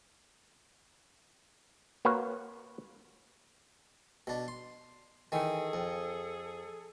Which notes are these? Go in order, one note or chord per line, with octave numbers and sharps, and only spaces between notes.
A#3 F#4 B4 C#5
B2 D4
C6
D#3 E3 G#4 A4
F2